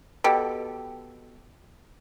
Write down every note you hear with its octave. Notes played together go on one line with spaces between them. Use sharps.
B2 G4 A4